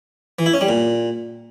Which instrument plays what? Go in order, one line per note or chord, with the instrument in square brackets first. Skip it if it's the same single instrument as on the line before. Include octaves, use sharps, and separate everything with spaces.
[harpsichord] E3
E4
C#4
G3
A#2